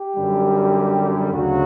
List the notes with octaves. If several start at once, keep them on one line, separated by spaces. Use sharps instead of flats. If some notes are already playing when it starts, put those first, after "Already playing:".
Already playing: G4
F#2 D3 G3
D2 C#3 F#3 F#4